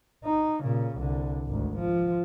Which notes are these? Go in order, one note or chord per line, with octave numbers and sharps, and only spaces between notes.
D#4
A#2 C#3
C2 D3
G#1 D2
F3